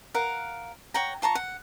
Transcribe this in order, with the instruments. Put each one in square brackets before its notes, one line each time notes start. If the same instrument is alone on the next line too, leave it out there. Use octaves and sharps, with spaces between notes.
[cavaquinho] A#4 F5 F#5
C#5 F#5 G5 A#5
F4 A5 A#5 C#6
F#5